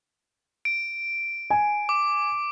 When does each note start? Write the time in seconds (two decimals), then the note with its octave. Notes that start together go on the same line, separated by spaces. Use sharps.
0.65 D7
1.50 G#5
1.89 D6